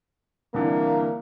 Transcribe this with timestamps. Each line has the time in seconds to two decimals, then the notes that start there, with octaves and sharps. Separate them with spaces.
0.54 C2 D3 E3 A#3